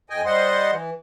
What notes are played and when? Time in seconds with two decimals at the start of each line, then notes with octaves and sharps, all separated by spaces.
0.10 F2 D#5 G5 G#5
0.25 G3 C5 D#5 F#5 C6
0.71 E3